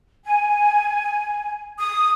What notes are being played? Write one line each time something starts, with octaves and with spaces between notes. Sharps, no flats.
G#5
D#6